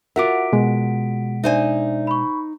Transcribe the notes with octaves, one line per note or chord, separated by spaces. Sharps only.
F4 F#4 A#4 E5 F#5 D6 B6 D7
B2 G#3
D4 D#4 C5 D5 E5 G#5
B5 C#6